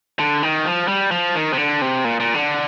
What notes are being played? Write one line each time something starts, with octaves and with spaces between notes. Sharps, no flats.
D3
D#3
F3
G3
F3
D#3
C3
D3
C3
A#2
A#2
D3